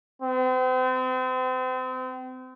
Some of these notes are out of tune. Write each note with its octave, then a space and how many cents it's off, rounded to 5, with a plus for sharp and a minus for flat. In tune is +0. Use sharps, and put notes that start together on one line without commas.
C4 -35